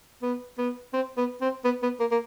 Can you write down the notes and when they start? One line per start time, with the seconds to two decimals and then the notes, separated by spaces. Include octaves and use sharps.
0.22 B3
0.58 B3
0.93 C4
1.17 B3
1.41 C4
1.65 B3
1.83 B3
2.00 A#3
2.11 A#3